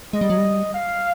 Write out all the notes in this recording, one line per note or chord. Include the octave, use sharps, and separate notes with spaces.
G#3 D#5
G3
F#3
G3
F5